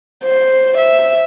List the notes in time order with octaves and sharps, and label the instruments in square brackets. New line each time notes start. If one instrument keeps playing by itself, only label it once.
[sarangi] C5
E5